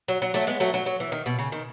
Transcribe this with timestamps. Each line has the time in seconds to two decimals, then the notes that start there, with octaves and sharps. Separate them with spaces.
0.08 F#3
0.22 F#3
0.34 F#3 A3
0.47 G#3 B3
0.60 F#3 A3
0.74 F#3
0.86 F#3
1.00 E3
1.12 D#3
1.26 B2
1.39 C#3
1.52 D#3